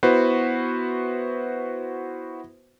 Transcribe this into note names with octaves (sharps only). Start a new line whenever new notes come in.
B3 E4 F#4 B4 C5